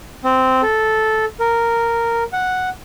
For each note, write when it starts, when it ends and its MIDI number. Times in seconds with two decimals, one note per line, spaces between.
0.24 0.62 60
0.62 1.25 69
1.40 2.24 70
2.33 2.69 78